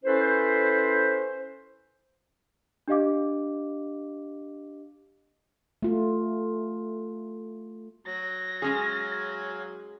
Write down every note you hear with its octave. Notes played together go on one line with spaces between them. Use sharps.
C#4 E4 A4 B4 C5
D4 G4 D#5 F5 D6
A3 F4
F#3 A#6
G#3 C#4 G#4 C#5 F5 G#5